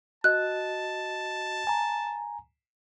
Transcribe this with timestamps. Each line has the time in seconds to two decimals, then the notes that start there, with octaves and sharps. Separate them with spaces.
0.24 F#4 D#5 A5 F#6
1.67 G#5 A#5